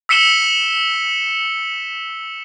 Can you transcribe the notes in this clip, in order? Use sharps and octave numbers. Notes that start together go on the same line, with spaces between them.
E6 B6 C#7 E7 G7